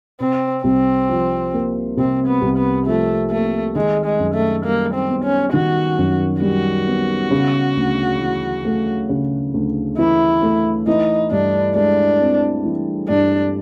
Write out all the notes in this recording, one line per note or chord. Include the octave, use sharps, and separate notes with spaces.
C3 C4
C2 C4
F3
A#3
C3 C4
B3
C2
B3
F3 A3
A3 A#3
D#3 G#3
G#3
F#2
A3
G3 A#3
C4
B3
C#4
D#3 F#4
F#2
G3 F#4
B3
C#3
D2
E3
A3
C#3
D2
E3 E4
A3
E3 D#4
G2 D4
G#3 D4
C4
E3
G2 D4